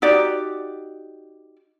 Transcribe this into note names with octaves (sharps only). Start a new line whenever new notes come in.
D#4 F#4 G4 D5